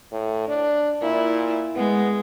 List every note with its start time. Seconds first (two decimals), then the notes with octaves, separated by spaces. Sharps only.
0.12 A2
0.49 D4
1.02 A#2 E4
1.76 G#3 B3